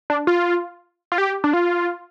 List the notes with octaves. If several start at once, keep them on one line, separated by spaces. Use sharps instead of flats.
D4
F4
F4
G4
D4
F4